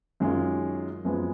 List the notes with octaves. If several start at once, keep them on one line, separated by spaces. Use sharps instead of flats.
F#2 D#3 G#3 C#4 F4
F#2 F3 G#3 B3